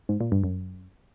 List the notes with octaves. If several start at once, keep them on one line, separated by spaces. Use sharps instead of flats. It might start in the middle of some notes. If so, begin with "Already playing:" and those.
G#2
A#2
G2
F#2